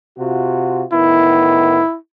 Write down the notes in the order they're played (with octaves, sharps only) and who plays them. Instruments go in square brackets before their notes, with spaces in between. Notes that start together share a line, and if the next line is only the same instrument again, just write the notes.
[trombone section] C3 F4 F#4
[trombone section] A2 D#3 B3 [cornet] E4